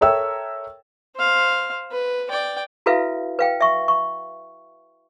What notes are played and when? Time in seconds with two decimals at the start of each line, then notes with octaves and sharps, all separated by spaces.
0.01 A4 A#4 C#5 E5 G5 E6
1.15 C5 F5
1.91 B4
2.30 D5 G5
2.86 E4 F#4 A4 B4 E5 F5
3.39 B4 F5 G5
3.61 E5 C#6
3.88 C#6